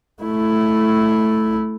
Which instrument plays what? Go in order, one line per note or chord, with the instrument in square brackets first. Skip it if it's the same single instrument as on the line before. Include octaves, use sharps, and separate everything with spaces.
[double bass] A3 E4